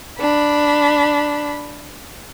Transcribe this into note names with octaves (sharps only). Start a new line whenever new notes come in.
D4 B5